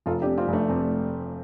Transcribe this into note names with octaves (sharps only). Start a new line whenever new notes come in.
F1 F4 A4
D4 G4
C3
C4 F4
F1
A3 D4
F1 C4